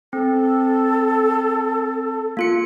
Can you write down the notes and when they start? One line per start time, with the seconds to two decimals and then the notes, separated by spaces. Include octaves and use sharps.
0.13 C4 A4
2.37 A#3 F4 C#7